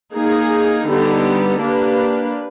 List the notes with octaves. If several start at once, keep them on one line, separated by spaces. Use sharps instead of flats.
A#3 D#4 G#4
D3 G3 B3 D#4 G4
A#3 D4 G4 B4